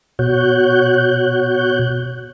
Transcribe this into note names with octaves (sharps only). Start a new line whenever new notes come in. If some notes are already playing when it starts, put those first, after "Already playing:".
B2 F#4 C#5 F#6 G6